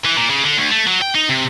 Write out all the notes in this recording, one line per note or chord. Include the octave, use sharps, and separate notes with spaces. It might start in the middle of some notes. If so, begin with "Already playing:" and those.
E3
A#2
C#3
D3
D2
A3
F#3
G5
D#4
C3